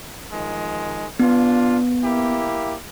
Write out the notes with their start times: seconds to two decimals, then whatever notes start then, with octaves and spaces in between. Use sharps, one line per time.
0.32 D#3 F3 G#3
1.19 B3 D4 F4
2.03 A#3 E4 G4